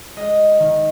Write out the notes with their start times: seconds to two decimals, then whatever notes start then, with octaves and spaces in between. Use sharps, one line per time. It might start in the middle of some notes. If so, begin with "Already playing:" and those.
0.16 G#3 D#5
0.59 D#3